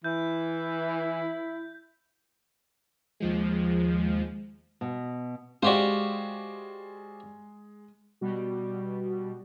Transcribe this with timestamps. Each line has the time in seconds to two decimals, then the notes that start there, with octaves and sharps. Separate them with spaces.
0.04 E3 E4 G6
3.20 D#2 F3 G#3
4.81 B2
5.63 G#3 F#4 G4 C5 D5 F5
8.21 B2 G3 F#4